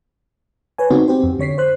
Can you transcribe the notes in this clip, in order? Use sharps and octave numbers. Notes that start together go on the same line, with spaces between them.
B4 C#5 G#5
C#3 B3 C4 D#4 F#4
C4 G4 C5
F2
D3 C#5 B6 C7
C5 F#6